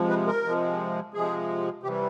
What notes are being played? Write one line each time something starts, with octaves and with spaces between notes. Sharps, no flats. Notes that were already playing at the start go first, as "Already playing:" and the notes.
Already playing: C3 F3 G#3
B4
A#4
C3 F3 G#3
C3 F3 G#3 G#4
C3 E3 G3 G4